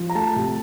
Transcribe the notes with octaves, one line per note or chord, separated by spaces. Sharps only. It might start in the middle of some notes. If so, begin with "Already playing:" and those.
Already playing: F3
A#5
A3 A5
C3